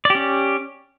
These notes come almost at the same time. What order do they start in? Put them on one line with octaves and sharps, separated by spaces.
D5 G4 C#4